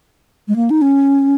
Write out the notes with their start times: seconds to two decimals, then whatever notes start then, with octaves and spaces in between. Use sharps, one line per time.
0.48 G#3
0.56 A#3
0.70 D#4
0.82 C#4